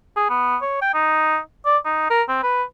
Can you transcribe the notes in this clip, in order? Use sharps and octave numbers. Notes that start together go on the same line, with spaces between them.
G#4
B3
C#5
G5
D#4
D5
D#4
A#4
C4
B4